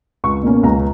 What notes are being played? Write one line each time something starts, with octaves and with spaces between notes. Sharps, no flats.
C#2 C#6
B2 A#3 C#4
C#2 A#5